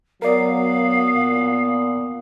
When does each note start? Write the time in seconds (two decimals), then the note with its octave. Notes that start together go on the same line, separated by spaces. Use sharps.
0.22 F#3 B3 A#4 D5 F5
1.15 A#2